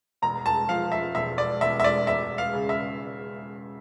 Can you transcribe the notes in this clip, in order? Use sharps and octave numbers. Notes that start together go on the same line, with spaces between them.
E1 A#5
A5
F3 F5
E5
E1 E5
D5
E1 E5
E5
D5
E1 E5
F5
C#3
E5